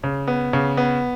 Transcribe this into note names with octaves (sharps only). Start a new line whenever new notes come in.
C#3
B3
C#3
B3